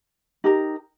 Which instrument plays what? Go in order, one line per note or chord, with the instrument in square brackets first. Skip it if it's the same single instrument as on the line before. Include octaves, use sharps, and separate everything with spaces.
[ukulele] D#4 G4 A#4